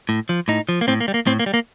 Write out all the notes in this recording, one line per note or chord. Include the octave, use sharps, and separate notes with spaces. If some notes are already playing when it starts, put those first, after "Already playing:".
A2
F3
A2 D#4
F3
A#3
A2 C4
A#3
G3
A#3
A2 C4
A#3
G3
A#3